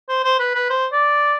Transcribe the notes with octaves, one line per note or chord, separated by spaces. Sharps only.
C5
C5
B4
B4
C5
D5